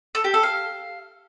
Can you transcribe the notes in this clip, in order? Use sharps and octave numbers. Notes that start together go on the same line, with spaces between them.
A4
G4
A4
F5